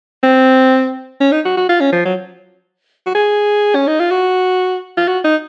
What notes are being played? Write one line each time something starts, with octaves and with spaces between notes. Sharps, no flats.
C4
C#4
D#4
F#4
F#4
F4
C#4
F3
F#3
F#4
G#4
C#4
D#4
F4
F#4
F4
F#4
D#4